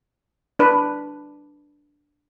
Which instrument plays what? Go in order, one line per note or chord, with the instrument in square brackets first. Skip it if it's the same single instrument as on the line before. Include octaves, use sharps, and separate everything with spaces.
[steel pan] D4 B4